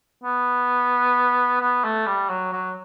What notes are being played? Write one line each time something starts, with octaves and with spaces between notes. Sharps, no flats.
B3
B3
A3
G3
F#3
F#3